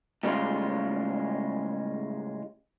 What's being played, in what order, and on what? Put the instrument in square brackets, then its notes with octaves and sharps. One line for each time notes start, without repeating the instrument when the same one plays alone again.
[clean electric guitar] A2 C#3 G3 G#3 F4